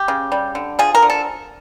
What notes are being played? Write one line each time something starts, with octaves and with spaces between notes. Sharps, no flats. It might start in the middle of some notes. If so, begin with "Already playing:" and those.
Already playing: G4
C#3
G3
D3
F3 G#4
A#4
D3
A4